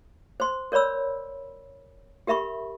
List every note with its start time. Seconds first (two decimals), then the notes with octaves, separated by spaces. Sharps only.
0.40 C5 C6
0.72 A#4 C#5 D5 B5 E6
2.27 G4 A#4 E5 B5 C#6